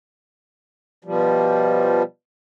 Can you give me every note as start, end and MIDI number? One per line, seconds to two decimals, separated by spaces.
1.05 2.03 47
1.05 2.03 53
1.05 2.03 55